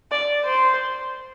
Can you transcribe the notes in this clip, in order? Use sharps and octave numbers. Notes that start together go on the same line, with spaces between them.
D5
C5